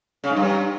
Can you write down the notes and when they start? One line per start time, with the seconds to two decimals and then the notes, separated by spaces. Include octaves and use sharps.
0.24 C#3
0.30 G#2
0.36 G2